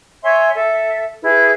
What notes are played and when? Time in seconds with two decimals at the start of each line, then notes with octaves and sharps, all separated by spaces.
0.23 C#5 E5 G#5 C6
0.55 A4 E5
1.23 E4 G#4 B4